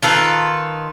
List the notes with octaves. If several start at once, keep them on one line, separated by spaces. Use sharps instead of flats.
D#3 F4 A4 B4